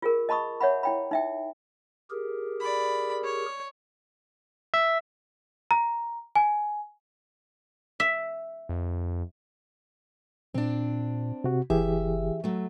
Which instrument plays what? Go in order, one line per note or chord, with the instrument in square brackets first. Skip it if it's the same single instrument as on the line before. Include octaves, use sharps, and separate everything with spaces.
[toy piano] F4 G#4 A#4
D#5 A5 B5 C#6 D#6
C#5 E5 F#5 B5
E4 G5 B5
D#4 E5 G5
[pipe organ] G4 G#4 A#4
[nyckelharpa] D5 B5
C#5
[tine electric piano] E5
[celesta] A#5
G#5
[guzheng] E5
[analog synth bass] F2
[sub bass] A#2 [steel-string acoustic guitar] C4 D4
[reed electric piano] C3 F#4
[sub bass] F#1 [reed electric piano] E3 G4 G#4 [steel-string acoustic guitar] E5
[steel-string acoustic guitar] F#3 A3